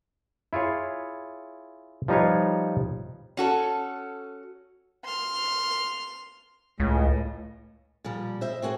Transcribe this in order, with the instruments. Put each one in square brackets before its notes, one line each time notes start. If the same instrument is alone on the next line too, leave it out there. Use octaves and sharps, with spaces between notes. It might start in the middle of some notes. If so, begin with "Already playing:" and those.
[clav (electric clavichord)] E4 F4 G#4 C#5
F3 G3 D#4 F4 B4 C#5
[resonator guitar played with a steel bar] C#4 F#4 A4
[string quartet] C6 F6
[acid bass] C#2 [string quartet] A2
[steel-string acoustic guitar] A#2 F3 G3
C5 D#5 E5
C4 F#4 G#4 B4 C5